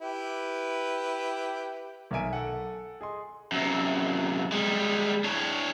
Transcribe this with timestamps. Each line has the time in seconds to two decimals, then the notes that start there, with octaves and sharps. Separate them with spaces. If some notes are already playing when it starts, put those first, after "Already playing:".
0.01 E4 G4 B4
2.11 B1 A#4 E5 G#5 D7
2.33 A4 F#5
3.01 G#4 D#5 C6
3.52 F#2 C3
4.52 G3 G#3
5.24 D4 C#5